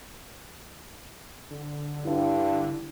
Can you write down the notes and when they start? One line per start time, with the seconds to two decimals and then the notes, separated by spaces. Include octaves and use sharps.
1.51 D3
2.05 G2 D4 E4